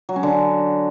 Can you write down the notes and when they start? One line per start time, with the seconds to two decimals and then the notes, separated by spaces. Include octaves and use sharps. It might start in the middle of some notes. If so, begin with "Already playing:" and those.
0.09 F#3
0.16 C#4
0.23 D3